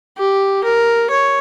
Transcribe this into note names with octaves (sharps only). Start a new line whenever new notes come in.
G4
A#4
C#5